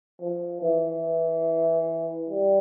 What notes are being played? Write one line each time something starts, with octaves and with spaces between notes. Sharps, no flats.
F3
E3
G3